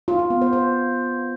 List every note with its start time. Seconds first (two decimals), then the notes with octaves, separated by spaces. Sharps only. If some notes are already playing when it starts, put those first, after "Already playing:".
0.08 F4
0.19 F4
0.30 B3
0.42 C5
0.53 C5